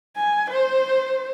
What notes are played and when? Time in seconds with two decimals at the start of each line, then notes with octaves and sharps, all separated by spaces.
0.16 G#5
0.50 C5